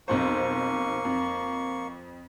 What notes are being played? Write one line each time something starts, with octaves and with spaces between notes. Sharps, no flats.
B1 F2 A#3 C5 C#6
F2